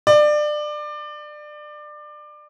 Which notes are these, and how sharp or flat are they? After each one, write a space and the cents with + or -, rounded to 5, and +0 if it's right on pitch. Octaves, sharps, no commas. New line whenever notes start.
D5 +25